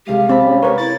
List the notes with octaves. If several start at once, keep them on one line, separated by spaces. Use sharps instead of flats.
C2 G#3 G4 F5 D#7
C4 A5 B5
C#4
A#4 B4 C#5
E4 A6